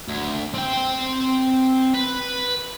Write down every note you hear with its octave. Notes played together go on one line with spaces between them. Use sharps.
D2
C4 G5
B4